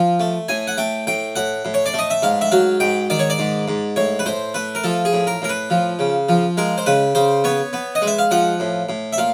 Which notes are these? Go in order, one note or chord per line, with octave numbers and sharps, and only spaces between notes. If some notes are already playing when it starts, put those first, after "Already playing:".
Already playing: F3
A3
A2 G#5
F#5
A3 G5
A2 G5
A2 F#5
A2
C#5
D5
A3 D#5
E5
G#2 F5
E5
F#3 F5
G#2 G5
D#3 D5
C#5
D5
G#2
G#2
A2 C#5
B4
A2 C5
A3 B4
A#4
F3 A4
G#4
A2
A#4
A2 A#4
B4
F3
C#3
F3
G#3 A#4
C5
C#3 B4
C#3 C5
B3 C#5
B3
D#5
G#3
E5
F5
F3 F#5
A2
A2
E5
A#2 F5